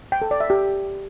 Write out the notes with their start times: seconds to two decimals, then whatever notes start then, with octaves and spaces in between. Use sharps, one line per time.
0.12 G5
0.22 A4
0.31 D5
0.40 E5
0.50 G4